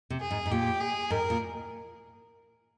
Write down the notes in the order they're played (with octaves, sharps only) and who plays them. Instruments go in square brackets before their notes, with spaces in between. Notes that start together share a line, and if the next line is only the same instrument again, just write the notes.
[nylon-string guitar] C3
[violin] G#4
[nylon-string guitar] G#2
G#2
[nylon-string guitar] A#2 [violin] G4
[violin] G#4
[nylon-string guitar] G#2 [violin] A#4
[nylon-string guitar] A#2